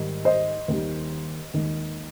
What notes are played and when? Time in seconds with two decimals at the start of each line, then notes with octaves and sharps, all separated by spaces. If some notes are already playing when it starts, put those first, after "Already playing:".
Already playing: G#2 D#3 G3
0.25 C5 D#5
0.68 D#2 D#3 G3
1.54 D#2 D#3 G#3